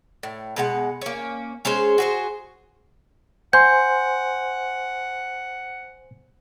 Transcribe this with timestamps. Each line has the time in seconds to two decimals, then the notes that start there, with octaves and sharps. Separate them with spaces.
0.23 A2
0.56 B2 G#3 F#5
1.02 A#3 C#4
1.65 G#3 C#4 G#4 C5
1.98 F#4 G#4 C5
3.53 C5 F#5 G#5 C6 G6